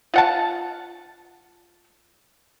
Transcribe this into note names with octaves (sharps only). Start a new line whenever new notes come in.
F4 F#5 A5